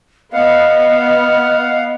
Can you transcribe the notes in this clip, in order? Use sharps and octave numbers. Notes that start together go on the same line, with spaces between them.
B3 D#5 F5 F#5